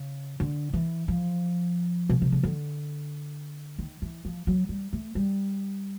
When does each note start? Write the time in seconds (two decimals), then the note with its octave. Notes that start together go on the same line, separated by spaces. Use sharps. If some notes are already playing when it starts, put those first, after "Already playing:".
Already playing: C#3
0.40 D3
0.73 E3
1.08 F3
2.09 B2
2.22 C3
2.32 C#3
2.43 D3
3.79 D#3
4.02 E3
4.25 F3
4.47 F#3
4.69 G3
4.93 A3
5.15 G3